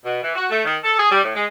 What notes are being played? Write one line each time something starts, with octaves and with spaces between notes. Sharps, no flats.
B2
E3
F#4
A3
D#3
A4
G#4
G3
A2
G#3